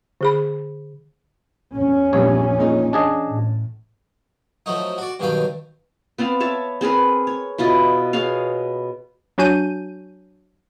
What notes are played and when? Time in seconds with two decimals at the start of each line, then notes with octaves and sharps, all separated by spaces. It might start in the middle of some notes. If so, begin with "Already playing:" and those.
0.21 D3 G#4 B5
1.75 E2 C#4
2.13 A#1 G2 C3 G3 C#5
2.58 A#2 G#3 D#4
2.93 D4 G#4 D#5 A5
3.27 A2
4.66 F3 F#3 A3 D#4
4.98 F#4 D5
5.19 G2 B2 D#3 F#3 F5 G5
6.18 B3 C4 D5 F5
6.40 C#5 E5 A5
6.81 C4 G#4 A#4 B4
7.27 C#5
7.58 B2 E4 F4 D#5
8.13 B3 G#4 C#5 F5
9.38 F#3 D4 F#4 G#5 G6 D#7